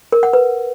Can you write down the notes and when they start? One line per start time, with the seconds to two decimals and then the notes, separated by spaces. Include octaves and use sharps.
0.12 A#4
0.23 F#5
0.33 B4